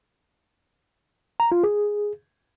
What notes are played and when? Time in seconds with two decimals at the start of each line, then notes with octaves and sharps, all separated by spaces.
1.40 A#5
1.52 F4
1.64 G#4